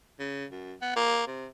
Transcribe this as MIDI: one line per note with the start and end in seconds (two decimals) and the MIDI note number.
0.20 0.45 49
0.51 0.74 42
0.82 0.93 59
0.96 1.26 58
1.27 1.47 48